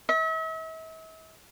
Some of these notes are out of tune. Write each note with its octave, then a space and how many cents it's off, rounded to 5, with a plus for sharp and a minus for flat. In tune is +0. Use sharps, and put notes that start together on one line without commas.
E5 -40